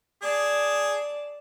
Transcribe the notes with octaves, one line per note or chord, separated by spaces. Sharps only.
G#4 D5 A5